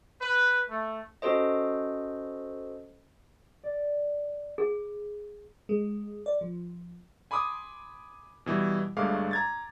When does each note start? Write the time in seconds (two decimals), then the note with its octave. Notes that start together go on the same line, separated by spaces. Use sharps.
0.21 B4
0.70 A3
1.22 C#4 F#4 A4 C5 D#5
3.63 D5
4.58 G#4
5.69 G#3
6.26 D5
6.41 F3
7.31 G#5 B5 C6 D6 D#6
8.46 B2 E3 G3
8.97 G1 G2 G#3 A3 F5 D6
9.31 A#5 G#6 A6